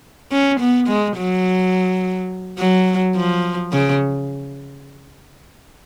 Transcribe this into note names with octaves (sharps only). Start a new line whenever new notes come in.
C#4
B3
G#3
F#3
F#3
F3
C#3